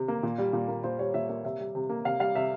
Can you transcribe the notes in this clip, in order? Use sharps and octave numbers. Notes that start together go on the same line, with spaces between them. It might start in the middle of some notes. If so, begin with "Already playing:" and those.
Already playing: C3
A#3
A#2
G3
A#2
A#3
A#2 C5
G3 C#5
A#2 E5
A#3 E5
C3 E5
G3
C3
A#3
C3 F5
G3 F5
C3 E5